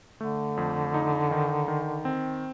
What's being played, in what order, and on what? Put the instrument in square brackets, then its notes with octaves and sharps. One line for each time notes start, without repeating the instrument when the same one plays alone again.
[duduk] D3 [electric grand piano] A3
[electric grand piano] F2
D#4
D#3
D#3
C4